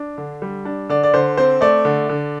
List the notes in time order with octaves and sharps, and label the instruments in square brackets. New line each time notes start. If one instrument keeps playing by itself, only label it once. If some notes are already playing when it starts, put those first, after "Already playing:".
Already playing: [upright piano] D4
D3
G3
D4
D3 D5
D5
D3 C5
C4 C5
A3 D5
D3
D3